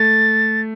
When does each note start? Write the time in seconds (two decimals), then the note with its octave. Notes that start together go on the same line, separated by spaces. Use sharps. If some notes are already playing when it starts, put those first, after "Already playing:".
Already playing: A3 A6